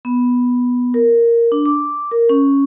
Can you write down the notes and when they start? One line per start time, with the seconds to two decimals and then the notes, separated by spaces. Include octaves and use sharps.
0.05 B3
0.94 A#4
1.52 D4
1.66 D6
2.11 A#4
2.29 C#4